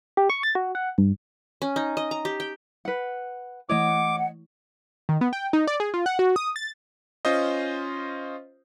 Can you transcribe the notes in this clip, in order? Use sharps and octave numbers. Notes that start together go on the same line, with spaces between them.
G4
C#6
A6
F#4
F#5
G2
C#4
D#4
D#5
A#5
G4
G5
B4 F#5
E3 A3 E4 C#5 D#5 F#5 D6
D#3
B3
G5
D#4
D5
G#4
F4
F#5
F#4
D#6
A6
C#4 F4 C5 D#5